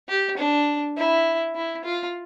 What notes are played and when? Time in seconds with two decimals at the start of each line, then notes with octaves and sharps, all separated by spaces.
0.09 G4
0.38 D4
0.97 E4
1.55 E4
1.84 F4